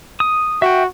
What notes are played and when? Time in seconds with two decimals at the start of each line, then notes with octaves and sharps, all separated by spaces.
0.20 D#6
0.62 F#4 E5 G5